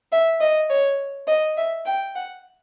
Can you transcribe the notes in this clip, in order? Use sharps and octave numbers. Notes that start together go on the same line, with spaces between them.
E5
D#5
C#5
D#5
E5
G5
F#5